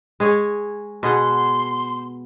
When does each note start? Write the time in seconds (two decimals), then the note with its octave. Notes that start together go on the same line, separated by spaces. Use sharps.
0.20 G#3 G#4 C#5
1.03 B2 G#4 F#5 C6